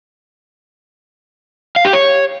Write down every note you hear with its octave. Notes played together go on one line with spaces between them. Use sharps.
F5
G4
C#5